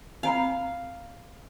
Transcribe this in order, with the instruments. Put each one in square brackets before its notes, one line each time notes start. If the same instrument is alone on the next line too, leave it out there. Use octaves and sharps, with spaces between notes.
[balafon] C4 A#5 B5 [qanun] F5